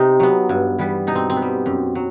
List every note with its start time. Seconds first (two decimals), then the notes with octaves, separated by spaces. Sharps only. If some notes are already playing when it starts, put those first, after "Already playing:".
Already playing: C3 C4 D#4
0.20 F#3 B3
0.49 G2
0.79 E3 G3 B3
1.07 B2 D#4
1.15 C4
1.30 C4
1.36 B3
1.42 G3
1.66 F#2
1.95 F#3